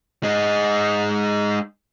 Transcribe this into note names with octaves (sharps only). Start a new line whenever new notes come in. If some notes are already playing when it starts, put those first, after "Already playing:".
G#3 D#4